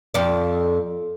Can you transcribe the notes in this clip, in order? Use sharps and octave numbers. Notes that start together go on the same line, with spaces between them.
F2 D5